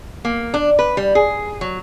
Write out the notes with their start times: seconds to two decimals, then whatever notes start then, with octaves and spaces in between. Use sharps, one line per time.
0.25 A#3
0.54 D4
0.79 B4
0.97 G3
1.15 G#4
1.61 F#3